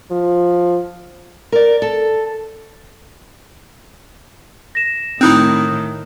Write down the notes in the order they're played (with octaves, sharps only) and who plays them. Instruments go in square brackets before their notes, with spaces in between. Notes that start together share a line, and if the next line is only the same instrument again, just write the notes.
[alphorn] F3
[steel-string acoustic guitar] A#4 D5
A4
[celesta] A#6 E7
[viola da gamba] A2 D#3 [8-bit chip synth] C4 D#4 E4 [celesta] D#6 F#6 G6